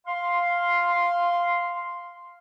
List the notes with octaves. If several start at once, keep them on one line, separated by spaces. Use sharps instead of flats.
F5 C6